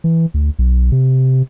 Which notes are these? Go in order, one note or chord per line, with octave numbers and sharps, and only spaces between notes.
E3
D2
B1
C3